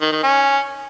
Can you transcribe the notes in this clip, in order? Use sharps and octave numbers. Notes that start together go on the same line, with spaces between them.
D#3
D#3
C#4